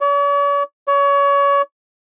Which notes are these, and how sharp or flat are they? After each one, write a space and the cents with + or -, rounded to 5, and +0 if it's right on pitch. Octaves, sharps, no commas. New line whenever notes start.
C#5 +45
C#5 +30